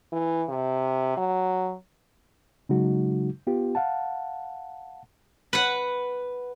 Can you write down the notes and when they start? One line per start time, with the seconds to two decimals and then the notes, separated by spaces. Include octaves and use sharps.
0.13 E3
0.49 C3
1.17 F#3
2.69 C#3 F#3 G#3 D#4 F#4
3.47 B3 F4 G4
3.75 F5 F#5 A5
5.53 B4 F#5